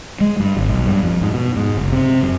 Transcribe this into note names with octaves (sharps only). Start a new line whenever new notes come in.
G#3
G2
G#1
B1
G2
F2
G#2
B2
G#2
F#1
C3
F#2